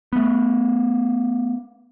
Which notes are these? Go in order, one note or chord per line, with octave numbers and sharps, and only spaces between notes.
A3 B3